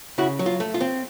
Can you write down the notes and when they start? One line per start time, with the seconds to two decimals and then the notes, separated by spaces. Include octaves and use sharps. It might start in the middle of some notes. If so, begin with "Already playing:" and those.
0.18 C#3 E4 F#4
0.39 F#3
0.46 F4
0.60 A3
0.74 F4
0.80 C4